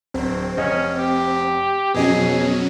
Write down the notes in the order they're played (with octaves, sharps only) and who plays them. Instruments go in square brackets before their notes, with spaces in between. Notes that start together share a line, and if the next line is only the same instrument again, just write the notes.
[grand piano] D1 C5 [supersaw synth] C4
[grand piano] F1 D#5 F6 [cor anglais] C#4
[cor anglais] G4
[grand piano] F2 D#5 [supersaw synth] B2 F#3 C#4 [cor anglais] G#4